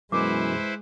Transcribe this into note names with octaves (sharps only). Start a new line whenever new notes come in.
F#2 B2 E3 G#3 E4 B4 C5 D6